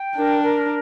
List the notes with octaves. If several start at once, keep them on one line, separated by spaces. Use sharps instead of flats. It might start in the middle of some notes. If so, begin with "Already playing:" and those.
Already playing: G5
D4 A#4
A#4